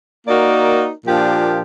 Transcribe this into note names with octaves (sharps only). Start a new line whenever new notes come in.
A#3 D#4 F#4 A#4 D5
A#2 F3 A#3 D4 G4